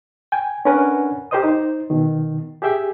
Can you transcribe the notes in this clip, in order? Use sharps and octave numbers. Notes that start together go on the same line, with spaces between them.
G5 G#5
C#4 D4 A#4 B4 F#5 G#5
G4 A#4 C5 D#5 D#6
D#4 C5
B2 D#3
G4 G#4 E5 G5